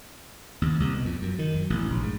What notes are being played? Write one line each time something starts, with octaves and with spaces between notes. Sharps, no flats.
D#2
C2
B2
F2
F#2
D#3
F#2
A1
A#1
G#2